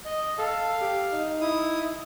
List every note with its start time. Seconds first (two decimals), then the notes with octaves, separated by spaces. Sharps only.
0.05 D#5
0.38 A4 F5
0.81 G4
1.12 D#4
1.41 E4 D#6